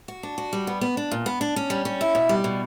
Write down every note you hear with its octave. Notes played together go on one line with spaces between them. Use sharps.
F#4
D4
F#4
G3
B3
B3
D4
A#2
B3
D4
C#4
G3
C#4
E4
B2
G3
B2